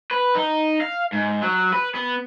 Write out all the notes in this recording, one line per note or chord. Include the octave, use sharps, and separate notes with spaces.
B4
D#4
F5
G#2
F#3
B4
B3